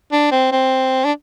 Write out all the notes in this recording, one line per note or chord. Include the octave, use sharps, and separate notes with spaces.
D4
C4
C4
D4